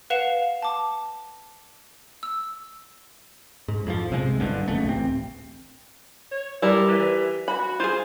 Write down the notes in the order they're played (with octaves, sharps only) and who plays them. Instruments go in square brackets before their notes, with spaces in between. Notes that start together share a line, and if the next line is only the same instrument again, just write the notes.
[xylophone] B4 F5 F#5 C7 E7 F7
A5 D6
E6
[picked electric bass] G#2
F2 E3 F3
B1 C3 G#3
F#1 G2 D3
B1 F2 C#3 A3
D1 A1 C4
[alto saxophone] C#5
[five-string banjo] G3 A#4 D5 [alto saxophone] E4
[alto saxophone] E3
[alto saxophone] F#4 [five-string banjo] B5
[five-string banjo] F4 G#4 [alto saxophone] C5